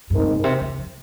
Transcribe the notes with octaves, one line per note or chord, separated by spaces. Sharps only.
G2 G#3 C4 D#4 A#4
A#2
A#2
C3
C#3
F3